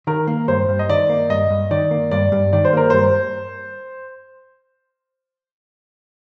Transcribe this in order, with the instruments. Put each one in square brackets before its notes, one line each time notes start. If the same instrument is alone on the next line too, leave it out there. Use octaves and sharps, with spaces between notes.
[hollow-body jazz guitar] D#3 [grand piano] A#4
[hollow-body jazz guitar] A#3
[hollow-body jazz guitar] G2 [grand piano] C5
[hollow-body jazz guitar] G2
[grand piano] D#5
[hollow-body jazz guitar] D#3 [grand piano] D5
[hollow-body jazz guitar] A#3
[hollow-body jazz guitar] G2 [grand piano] D#5
[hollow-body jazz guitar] G2
[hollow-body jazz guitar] D#3 [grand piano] D5
[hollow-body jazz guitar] A#3
[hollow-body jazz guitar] G2 [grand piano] D5
[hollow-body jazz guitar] G2
[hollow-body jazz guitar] D#3 [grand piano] D5
[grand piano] C5
[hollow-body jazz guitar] A#3 [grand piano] A#4
[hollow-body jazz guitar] G2 [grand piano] C5